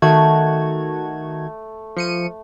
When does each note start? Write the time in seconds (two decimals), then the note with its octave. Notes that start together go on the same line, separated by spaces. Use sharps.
0.02 D#3 A3 F#4 A5 G#6
1.97 F3 C#7 D#7